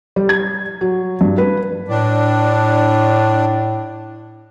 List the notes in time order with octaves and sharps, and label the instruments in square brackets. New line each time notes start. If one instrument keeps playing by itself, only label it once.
[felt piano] G3
G#6
F#3
G2
B4
[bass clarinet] A2 [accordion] D4